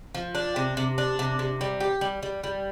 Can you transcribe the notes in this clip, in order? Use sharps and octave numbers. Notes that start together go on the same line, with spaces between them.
F3
D4
C3
C3
D4
C3
C3
G3
G4
G3
G3
G3